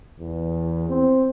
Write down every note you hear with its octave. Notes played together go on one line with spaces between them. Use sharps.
E2
C4